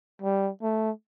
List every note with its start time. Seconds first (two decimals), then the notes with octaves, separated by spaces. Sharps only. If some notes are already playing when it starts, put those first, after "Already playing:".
0.22 G3
0.62 A3